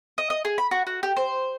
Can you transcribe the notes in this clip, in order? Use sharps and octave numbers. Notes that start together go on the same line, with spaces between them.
D#5
D#5
G#4
B5
F#4
F#4
G4
C5